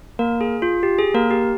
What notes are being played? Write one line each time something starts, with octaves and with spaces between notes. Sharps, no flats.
A#3 A#4
G#4
F4
G4
G#4
A#3 A#4
G4